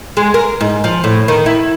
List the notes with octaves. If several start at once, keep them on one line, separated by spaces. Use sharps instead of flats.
G#3
A#4
G#2
F3
A2
D#3
E4